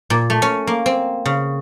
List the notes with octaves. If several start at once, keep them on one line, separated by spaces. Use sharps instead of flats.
A#2
A3
C#4
A#3
C4
C#3